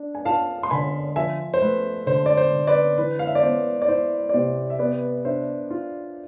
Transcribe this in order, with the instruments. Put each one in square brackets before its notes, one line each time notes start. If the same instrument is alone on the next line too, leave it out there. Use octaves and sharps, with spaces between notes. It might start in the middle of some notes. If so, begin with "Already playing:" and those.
Already playing: [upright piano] D4
[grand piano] G#5
[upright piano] F4 [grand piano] F5 A5
[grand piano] C6
[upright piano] D3 [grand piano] G#5 B5
[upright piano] F3 [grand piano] E5 G#5
[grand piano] C5
[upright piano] A3 [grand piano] B4
[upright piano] D3 [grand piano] C5
[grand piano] D5
C5
[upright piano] D3
[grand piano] B4 D5
[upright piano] E3 [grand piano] B4
[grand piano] F5
E5
D5
[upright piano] B3 [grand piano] C5
[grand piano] D5
[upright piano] E4 [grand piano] C5
[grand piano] D5
[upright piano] C3 [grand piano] C5
[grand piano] E5
[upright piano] B3 [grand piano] B4 D5
[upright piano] D4 [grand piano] C5 E5
[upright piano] F4